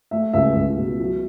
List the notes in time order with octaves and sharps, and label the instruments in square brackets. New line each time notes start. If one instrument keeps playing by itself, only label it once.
[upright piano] A3 E5
C#2 E5
C#2
B2
F#3